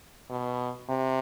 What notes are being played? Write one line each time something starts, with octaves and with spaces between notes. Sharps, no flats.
B2
C3